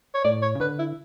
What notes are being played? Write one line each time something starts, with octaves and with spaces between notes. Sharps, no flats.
C#5
A2 D5
C#5
C#3
D3 B4
E4